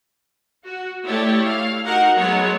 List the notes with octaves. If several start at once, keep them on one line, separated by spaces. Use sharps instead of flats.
F#4
A3 E4 G4 C#5 D5
F5
D#4 F#4 A#4 F#5
F#3 G#3 A3 B3 C#5 F#5